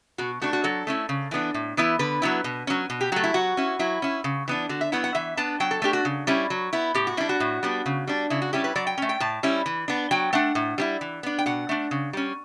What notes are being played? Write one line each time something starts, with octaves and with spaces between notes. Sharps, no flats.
B2 F#4
A3 D4 F#4
F#4
F#3 A4
A3 C#4 E4
C#3
E3 B3 D4
A2
E3 B3 E4
D3 B4
F#3 B3 E4
B2
F#3 C#4
B2
G4
F#3 A3 F#4
E4
F#3 F#4
C#4 E4
F#3 E4
C#4 E4
C#3
E3 B3 D4
D3 F#4
E5
F#3 B3 E4 F#5
F#5
E3 E5
B3 D4 A5
F#3 G5
A4
A3 D4 G4
F#4
C#3
G3 C#4 E4
F#3
B3 E4
A2 G4
F#4
G3 D4 E4
F#4
A2
G3 B3 D4
C#3
G3 D4
C#3 E4
F#4
G3 C#4 E4 G4
B4
F#3 D5
G5
A3 C#4
G5
A2 A5
G3 C#4 E4
E3
B3 D4
F#3 G5
A3 D4 F#5
A2
G3 C#4 E4
E3
B3 D4
G5
B2 F#5
A3 D4
C#3
G3 C#4